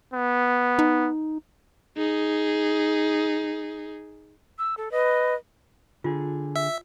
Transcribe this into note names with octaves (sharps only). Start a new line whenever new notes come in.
B3
D#4
D#4 G#4
E6
A4
B4 D#5
D3 F4 G#4
E5